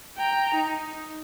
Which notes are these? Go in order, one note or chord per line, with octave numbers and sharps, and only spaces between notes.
G5 A#5
D#4